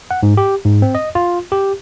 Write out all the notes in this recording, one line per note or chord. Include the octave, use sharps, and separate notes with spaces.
F#5
G#2
G4
G#2
C4
D#5
F4
G4